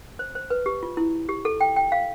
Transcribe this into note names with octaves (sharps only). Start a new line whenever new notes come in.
C5
C5
B4
G4
F4
E4
G4
A4
G5
G5
F5